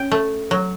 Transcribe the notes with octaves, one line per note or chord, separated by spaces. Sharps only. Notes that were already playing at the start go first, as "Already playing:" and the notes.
Already playing: C#4 G5
A3
F#3